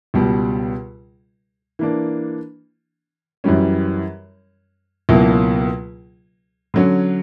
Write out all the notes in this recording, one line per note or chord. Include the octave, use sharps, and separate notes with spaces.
C#2 B2 G3
E3 A#3 D4
F#2 E3 G3 C#4
C#2 B2 F#3 A#3 E4
D3 F#3 C#4